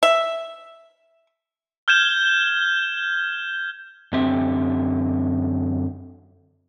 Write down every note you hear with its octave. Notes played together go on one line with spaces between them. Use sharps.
E5
F6 G6 G#6 E7 G7
F#2 D3 C4 G4 E5